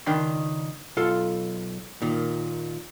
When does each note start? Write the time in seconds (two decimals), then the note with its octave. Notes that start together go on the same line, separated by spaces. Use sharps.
0.06 C#2 D#3 D4 G5 B5 C6
0.97 B1 F4 A4 F5 C6
2.02 A#2 D#3